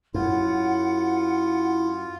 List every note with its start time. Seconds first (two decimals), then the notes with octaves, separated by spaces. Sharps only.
0.14 F#2 E4 F4 F#5